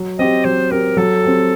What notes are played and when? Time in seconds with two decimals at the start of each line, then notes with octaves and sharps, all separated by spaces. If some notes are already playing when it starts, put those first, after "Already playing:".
Already playing: F#3
0.19 C4 G4 D#5
0.45 F#3 C5
0.71 C4 G4 A#4
0.97 F#3 A4
1.23 C4 G4